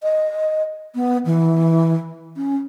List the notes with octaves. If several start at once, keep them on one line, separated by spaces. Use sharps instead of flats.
D#5
B3
E3
C#4